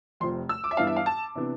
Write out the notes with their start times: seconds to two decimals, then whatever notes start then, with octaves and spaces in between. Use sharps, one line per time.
0.20 F1 F2 C3 F3 C4 C6
0.49 E6
0.64 D6
0.71 E5
0.77 G2 E3 B3 D4 F5
0.87 E5
0.96 F5
1.06 A5
1.35 C3 E3 B3 D4